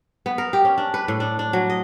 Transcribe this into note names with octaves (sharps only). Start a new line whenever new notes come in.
B3
A#4
G4
C#4
D4
B4
A2
D4
D4
F#3
D#5